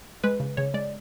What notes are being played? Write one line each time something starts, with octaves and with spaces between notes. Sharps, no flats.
G#3 B4
C#3
C#3 C#5
G#3 D5